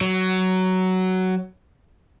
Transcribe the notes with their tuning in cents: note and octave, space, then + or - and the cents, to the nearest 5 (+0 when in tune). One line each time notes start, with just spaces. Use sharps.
F#3 +10